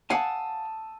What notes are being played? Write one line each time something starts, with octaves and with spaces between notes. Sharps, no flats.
F5 F#5 G#5 A5 D#6 E6